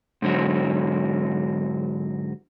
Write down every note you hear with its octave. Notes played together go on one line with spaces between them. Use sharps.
G#2 D3 F#3